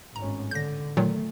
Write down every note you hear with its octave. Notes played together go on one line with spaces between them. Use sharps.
G#1 A2 C#4 A#5
D3 G6 A#6
A#2 D#3 F#3 A3